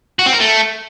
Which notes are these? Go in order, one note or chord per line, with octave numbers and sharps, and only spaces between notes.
F#4
C4
A#4
A3